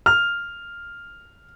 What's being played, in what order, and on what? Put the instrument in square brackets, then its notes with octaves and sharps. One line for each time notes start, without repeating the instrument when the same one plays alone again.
[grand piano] F6